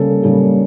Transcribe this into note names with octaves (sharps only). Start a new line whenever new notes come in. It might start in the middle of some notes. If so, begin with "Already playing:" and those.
Already playing: C#3 G3 A#3 A4
C#3 G3 A#3